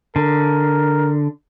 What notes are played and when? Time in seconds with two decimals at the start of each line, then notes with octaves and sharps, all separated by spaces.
0.16 D3 A#4